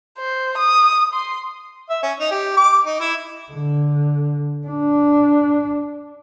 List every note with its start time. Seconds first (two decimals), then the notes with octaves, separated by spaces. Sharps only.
0.18 C5
0.58 D#6
1.13 C6
1.90 E5
2.03 C#4
2.19 D#4
2.31 G4
2.57 D6
2.86 D#4
3.00 E4
3.52 D3
4.67 D4